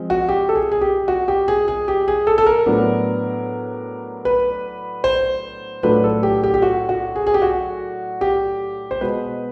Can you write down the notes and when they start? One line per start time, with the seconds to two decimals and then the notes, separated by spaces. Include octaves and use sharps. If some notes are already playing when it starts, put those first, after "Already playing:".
Already playing: F3 G#3 C4
0.10 F#4
0.29 G4
0.49 A4
0.56 G#4
0.72 G#4
0.81 G4
1.08 F#4
1.28 G4
1.48 G#4
1.68 G#4
1.88 G4
2.08 G#4
2.27 A4
2.38 A4
2.46 A#4
2.66 A2 F#3 B3 D4
4.25 B4
5.04 C5
5.83 A2 F#3 A3 D4 F4 B4
6.04 A4
6.23 G4
6.43 G4
6.54 G4
6.62 F#4
6.89 F#4
7.16 G#4
7.27 G#4
7.34 G4
7.42 F#4
8.21 G4
8.91 C5
9.01 B2 G#3 B3 B4